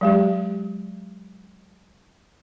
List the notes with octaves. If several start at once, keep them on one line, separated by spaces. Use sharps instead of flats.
F#3 G#3 G4